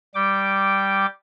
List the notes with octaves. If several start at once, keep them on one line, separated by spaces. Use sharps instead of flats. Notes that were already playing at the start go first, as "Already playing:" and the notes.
G3 G5 D6